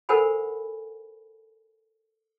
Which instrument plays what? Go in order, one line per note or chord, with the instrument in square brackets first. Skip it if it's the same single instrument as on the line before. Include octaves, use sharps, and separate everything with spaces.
[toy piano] A4 A#4 C5 F#5 G#5 B5